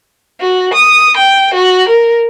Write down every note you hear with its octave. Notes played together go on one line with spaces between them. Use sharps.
F#4
D#6
G5
F#4
A#4